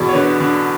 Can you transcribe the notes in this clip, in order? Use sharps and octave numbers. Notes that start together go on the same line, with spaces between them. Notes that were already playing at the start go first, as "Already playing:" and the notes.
Already playing: E2 B2
C#5
D3 B4
D3